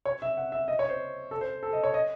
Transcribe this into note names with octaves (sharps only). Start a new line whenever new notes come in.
C#5
E5
F#5
E5
D#5
C#5
C5
A4
C5
A4
D#5
C#5
D#5